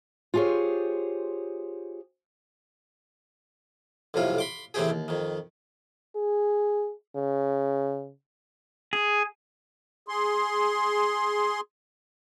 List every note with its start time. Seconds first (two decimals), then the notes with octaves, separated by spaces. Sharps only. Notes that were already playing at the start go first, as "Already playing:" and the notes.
0.34 F4 G4 G#4 C5 C#5
4.14 B1 F2 A2 C3 F4
4.38 B5 C6 D6
4.74 A2 C3 E3 C4 G4 G#4
4.90 D#2
5.08 F2 D#3
6.16 G#4
7.16 C#3
8.93 G#4
10.08 G#4 C6